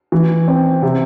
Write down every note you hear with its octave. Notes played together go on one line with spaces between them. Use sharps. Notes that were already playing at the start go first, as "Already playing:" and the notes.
E3
C4
C3